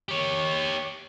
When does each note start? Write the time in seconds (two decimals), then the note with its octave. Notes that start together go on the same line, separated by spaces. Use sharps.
0.09 G4 C#5